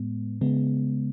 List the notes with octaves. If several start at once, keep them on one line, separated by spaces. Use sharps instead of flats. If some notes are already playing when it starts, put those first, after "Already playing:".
Already playing: A2 G#3 B3
C#3 G#3 B3